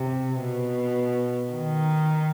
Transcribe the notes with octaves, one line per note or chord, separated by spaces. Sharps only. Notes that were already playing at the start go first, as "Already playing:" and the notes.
Already playing: C3
B2
D#3